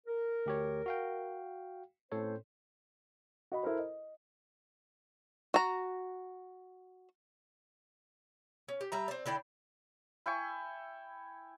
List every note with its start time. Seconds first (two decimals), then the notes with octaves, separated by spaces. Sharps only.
0.07 A#4
0.46 D2 G4 C#5
0.86 F#4 F5 G5
2.12 A2 C4 C#4 A4 C5 C#5
3.52 F#4 D#5 B5
3.63 E4 A4 A#4 C5
3.79 D#5
5.54 F#4 A#5
8.69 C#4
8.81 G4
8.92 G3 E5 A#5
9.08 C4 D5
9.26 D3 E4 D5 G5
10.26 E4 G5 G#5 C#6